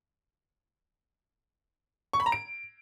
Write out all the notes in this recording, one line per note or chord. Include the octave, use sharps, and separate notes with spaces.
C#6
B5
A#5
D7